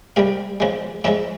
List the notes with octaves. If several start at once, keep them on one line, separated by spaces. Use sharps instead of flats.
C2 C3 G3 F5
E2 C#3 F3 G#3
E2 C#3 F3 G#3 E5